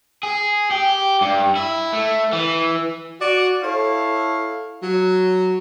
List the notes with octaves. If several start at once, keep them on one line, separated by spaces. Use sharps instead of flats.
G#4
G4
G2
E4
A3
E3
F#4 D5
E4 A4 C#5 F5
F#3